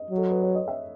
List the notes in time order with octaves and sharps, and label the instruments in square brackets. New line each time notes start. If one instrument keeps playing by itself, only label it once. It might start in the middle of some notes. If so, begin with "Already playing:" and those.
Already playing: [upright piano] D#5
[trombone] F#3
[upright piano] A4
B4
C#5
D#5
E5